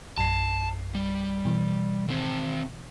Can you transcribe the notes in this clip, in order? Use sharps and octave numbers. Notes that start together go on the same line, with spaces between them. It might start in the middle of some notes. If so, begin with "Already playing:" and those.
A#1 F#2 A5 C7
G3
B2 E3
D#3 C4